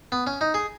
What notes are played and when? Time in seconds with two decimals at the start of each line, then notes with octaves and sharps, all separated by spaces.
0.12 B3
0.27 C#4
0.41 D#4
0.54 G#4